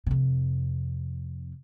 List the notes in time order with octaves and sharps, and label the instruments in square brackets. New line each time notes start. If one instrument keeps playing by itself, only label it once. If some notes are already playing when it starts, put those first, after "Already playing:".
[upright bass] F2 C3